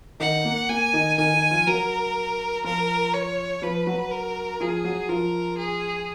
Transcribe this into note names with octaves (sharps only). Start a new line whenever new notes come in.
D#3 D#4 F#5
A#3
A#3 G#5
D#3 D#4
D#3 D#4 G#5
D#3 D#4
F3 F4
F#3 F#4 A#4
F3 F4 A#4
C#5
F3 F4 B4
F#3 F#4
A#4
F3 F4 G#4
F#3 F#4
F3 F4 A#4
G#4